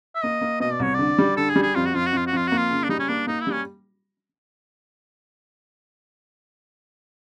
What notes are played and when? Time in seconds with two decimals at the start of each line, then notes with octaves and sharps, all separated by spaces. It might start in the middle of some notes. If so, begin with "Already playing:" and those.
0.15 E5
0.23 A#3 D#5
0.41 A#3
0.60 B2 D#5
0.73 D5
0.80 C2 C#5
0.94 D3 D5
1.18 G3
1.37 D3 A4
1.49 G#4
1.56 G3
1.62 G#4
1.75 F2 F4
1.86 F#4
1.94 F2 F4
2.06 F#4
2.13 F2 F4
2.27 F#4
2.33 F2 F4
2.47 A#3 F#4
2.57 F4
2.71 C#3
2.84 D4
2.89 G3 D#4
2.99 C#4
3.08 A#3 D4
3.27 A#3 D#4
3.41 E4
3.47 G3
3.52 C#4